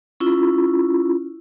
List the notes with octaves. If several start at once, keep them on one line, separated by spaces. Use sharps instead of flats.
C#4 E4 F4